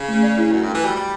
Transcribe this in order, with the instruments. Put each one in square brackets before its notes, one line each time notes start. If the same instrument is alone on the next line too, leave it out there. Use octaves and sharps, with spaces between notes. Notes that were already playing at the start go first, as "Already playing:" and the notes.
Already playing: [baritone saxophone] C#3
[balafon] A3
D5
E4
[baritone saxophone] F#2 [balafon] D5
[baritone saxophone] G2 [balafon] A4
[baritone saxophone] E3
[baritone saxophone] G3 [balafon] F#4
[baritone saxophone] G3 [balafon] D5